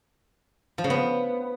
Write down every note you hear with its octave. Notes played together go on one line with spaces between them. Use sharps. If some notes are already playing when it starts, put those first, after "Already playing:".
F3
C#3
B3